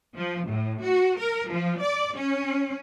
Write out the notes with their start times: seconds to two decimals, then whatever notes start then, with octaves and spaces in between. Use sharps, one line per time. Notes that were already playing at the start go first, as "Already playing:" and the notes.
0.16 F3
0.49 A2
0.82 F#4
1.18 A#4
1.51 F3
1.82 D5
2.17 C#4